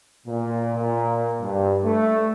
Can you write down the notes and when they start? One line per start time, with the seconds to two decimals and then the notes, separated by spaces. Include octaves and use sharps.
0.27 A#2
0.75 A#2
1.41 G2
1.84 A3